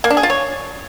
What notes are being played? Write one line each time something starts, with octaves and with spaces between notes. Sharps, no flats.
A#3
D4
G#4
F4
C#5